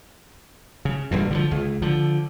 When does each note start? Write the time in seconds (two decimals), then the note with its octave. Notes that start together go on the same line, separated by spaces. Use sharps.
0.85 C#3
1.11 E1 G2 A#2
1.31 D3 D#3 F3
1.51 C#2
1.82 D3 F3